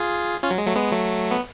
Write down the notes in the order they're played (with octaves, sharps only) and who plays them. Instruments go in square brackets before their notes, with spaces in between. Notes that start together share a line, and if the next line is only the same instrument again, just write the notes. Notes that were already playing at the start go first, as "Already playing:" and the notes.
Already playing: [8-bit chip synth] F4 G#4
C#4 F4
F#3
G#3
F#3 A3
G#3 B3
F#3 A3
B3